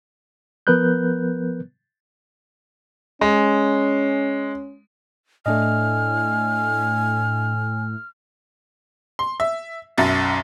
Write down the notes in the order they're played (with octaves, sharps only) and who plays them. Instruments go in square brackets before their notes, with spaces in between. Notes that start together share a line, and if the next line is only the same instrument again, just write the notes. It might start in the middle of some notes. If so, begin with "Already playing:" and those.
[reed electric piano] F3 B3 A#4 B4 F#6 G6
[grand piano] G#3 [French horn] C#4
[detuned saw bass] A2 [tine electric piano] A3 D4 D#5 [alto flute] G#5 [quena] F6
[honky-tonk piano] C6
E5
B1 F#2 E5 A6